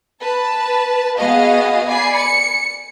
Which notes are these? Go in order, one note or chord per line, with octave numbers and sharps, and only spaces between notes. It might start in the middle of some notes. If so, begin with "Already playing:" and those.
B4 A5
B3 F#4 G#4 D#5 F5
D5 G#5 B5 C7
C#7